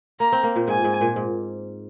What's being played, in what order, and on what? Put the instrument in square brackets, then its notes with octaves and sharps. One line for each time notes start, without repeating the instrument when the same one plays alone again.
[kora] A#3 [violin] A#5
[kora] C4
A#3
A#2
[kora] G#2 [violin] G#5
[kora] G#2
A#2
G#2